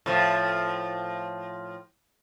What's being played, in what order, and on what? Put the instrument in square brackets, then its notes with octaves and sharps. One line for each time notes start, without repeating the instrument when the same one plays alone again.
[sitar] A2 F3